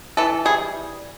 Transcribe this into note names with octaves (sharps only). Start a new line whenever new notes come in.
E3 A4
G3 G#4